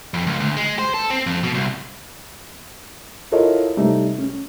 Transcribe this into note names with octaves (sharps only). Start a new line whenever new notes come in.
F2
C#2
D2
G#3
C5
A4
C4
F2
B2
C2
E4 F4 A4 A#4 C#5 D#5
C3 G3 A3 D#4
C#4